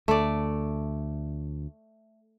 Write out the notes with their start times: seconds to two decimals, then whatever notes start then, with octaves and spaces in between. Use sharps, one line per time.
0.08 D2 A3 D5